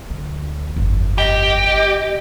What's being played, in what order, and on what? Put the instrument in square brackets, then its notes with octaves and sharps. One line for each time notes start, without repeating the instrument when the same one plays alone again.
[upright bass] D2
G1 F2
[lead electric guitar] G4 [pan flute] D#5